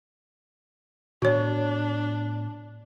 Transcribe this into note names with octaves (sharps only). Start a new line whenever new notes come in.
A2 B3 D4 F#4 C#5